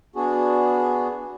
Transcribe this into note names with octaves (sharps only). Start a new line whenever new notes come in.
B3 D4 F#4 G#4